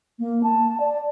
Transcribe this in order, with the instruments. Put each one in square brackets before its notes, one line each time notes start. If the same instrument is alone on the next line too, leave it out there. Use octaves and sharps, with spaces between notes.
[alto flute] A#3
A5
D5